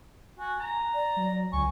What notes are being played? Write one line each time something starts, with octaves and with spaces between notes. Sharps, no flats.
F#4 G#5
A#5
D5
F#3
C#2 G#5 C#6